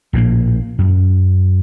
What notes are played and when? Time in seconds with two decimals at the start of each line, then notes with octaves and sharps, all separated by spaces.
0.13 A#1 A2 E3 A#3
0.78 F#2